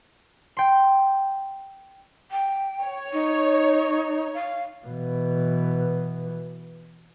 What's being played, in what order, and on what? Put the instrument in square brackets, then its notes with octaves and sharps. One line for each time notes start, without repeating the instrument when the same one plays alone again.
[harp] G5 C6
[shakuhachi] G5
[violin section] C#5
[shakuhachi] D#4
F5
[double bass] B2 E3